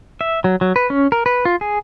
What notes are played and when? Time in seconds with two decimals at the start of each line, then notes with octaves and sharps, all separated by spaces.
0.21 E5
0.44 F#3
0.61 F#3
0.76 B4
0.90 C#4
1.12 A#4
1.26 B4
1.45 F4
1.61 G#4